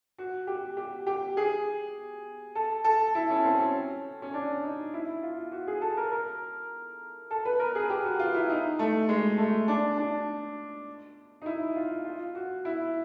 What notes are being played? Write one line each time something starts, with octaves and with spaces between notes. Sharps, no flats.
F#4
G4
G4
G4
G#4
A4
A4
E4
C#4
C4
C#4
C#4
D4
D#4
E4
F4
F#4
G#4
A4
A#4
A#4
A4
B4
A#4
G#4
G4
F#4
F4
E4
D#4
A3
G#3
A3
D4
D4
D#4
E4
F4
F4
F#4
E4